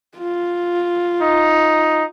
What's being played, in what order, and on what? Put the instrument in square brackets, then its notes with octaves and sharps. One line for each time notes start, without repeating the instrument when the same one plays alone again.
[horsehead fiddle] F4
[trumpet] D#4